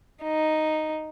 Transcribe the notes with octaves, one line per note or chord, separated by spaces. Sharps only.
D#4